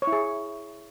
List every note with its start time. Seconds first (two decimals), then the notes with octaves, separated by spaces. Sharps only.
0.02 C#5
0.07 E4
0.12 G#4